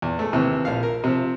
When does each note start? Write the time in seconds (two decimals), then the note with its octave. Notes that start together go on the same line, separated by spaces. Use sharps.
0.02 E2
0.19 G#3 A3
0.33 D#2 C3 E3
0.65 A#1 F5
0.83 A#4
1.04 C3 F3